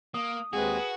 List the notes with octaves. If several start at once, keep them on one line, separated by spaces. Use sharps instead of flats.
A#3 D#6
D#2 G#3 C4 F#4 G#4 B4